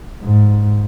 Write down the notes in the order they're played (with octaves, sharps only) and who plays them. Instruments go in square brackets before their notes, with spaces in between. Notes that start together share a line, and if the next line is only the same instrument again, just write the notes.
[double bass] G#2